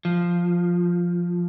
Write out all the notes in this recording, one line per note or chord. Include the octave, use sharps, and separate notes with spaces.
F3